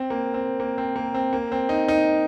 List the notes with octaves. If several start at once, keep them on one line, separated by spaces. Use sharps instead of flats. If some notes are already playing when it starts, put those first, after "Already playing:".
Already playing: C4
A#3
C4
A#3
C4
A#3
C4
A#3
C4
D#4
D#4